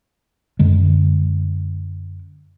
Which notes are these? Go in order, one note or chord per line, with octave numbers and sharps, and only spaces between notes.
F#2 D3 G#3